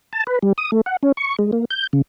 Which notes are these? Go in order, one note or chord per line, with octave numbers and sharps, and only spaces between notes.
A5
B4
G3
D#6
A3
F#5
C#4
C#6
G#3
A#3
G6
C#3